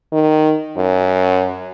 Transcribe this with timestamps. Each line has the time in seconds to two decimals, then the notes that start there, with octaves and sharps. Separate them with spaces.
0.12 D#3
0.77 F#2